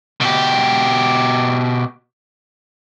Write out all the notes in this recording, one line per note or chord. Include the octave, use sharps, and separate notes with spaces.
B2 G4